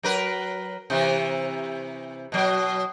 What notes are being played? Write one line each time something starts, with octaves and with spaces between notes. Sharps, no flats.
F#3 A#4 B4
C3 E3
B2 F#3